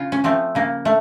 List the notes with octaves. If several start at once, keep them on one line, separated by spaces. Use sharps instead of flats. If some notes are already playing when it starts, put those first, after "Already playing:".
Already playing: C#3 F4
C#4
F3 A3 C4
C#3 A#3
A3